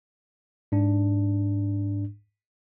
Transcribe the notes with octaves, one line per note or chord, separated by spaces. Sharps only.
G#2 D4